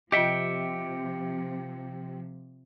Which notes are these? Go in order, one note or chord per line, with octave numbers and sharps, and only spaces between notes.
C3 F3 F4 G4 D#5 E5 G5 C#7